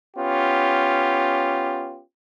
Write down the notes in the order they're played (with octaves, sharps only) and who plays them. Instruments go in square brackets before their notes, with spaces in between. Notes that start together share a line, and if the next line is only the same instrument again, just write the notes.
[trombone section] B3 C#4 F4 G4